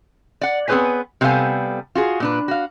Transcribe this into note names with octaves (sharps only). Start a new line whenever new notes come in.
D5 F#5
B3 C4 G#4 B4 C#5 G#5
C3 G3 B3 A4 F5 G#5
F4 F#4 G#4
A#2 D4 B4
F#4 F5